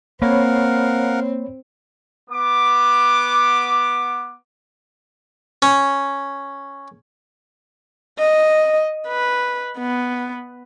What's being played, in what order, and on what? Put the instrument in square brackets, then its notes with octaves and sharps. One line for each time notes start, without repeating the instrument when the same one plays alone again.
[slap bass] A#3 [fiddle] C4 [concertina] A#4 F5 F#5 [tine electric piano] C#5 B5
[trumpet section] B3 D6
[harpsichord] C#4
[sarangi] D#5
B4
B3